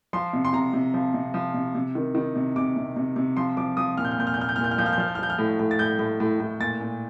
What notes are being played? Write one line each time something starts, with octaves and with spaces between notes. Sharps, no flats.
F3 C6
C3
C6
C3 A#5
C3
F3
C3
F3
C3
C3
D#3
D#3
C3
C3 D6
C3
C3
C3
F3 C6
F3 D6
F3 D#6
A#2 F6
G6
F6
A#2 G6
F6
G6
A#2 F6
G6
A#2 F6
G6
F6
F3 G6
F6
G6
F3 F6
G6
F6
F3 G6
F6
A2
A2
A6
A2 G6
A2
A2
A2
A#2 A6
A#2